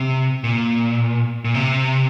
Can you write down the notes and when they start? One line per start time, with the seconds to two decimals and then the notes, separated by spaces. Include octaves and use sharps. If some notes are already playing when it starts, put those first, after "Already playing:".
Already playing: C3
0.44 A#2
1.44 A#2
1.54 C3